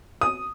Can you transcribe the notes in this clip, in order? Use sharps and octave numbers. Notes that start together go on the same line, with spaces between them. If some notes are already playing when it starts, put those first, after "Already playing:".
D#6